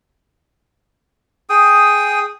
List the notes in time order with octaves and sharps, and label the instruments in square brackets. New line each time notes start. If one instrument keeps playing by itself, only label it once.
[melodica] G#4 G5 D#6